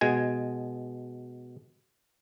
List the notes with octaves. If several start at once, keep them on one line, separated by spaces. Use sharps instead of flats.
B2 G#3 G#5